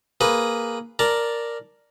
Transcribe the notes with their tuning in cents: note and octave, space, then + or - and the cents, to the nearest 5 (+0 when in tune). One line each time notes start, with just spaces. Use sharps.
A#3 +0 G#4 +0 B4 +0
A#4 +0 D5 +0 A5 +0